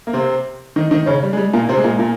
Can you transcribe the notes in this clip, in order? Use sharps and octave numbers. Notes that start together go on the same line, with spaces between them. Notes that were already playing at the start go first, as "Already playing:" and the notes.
A#3
C3 C4
D#3 D#4
D#3 D#4
C#3 C#4
G3
G#3
G3
A#2 A#3
C3 C4
G#3
A#2 A#3
A#2 A#3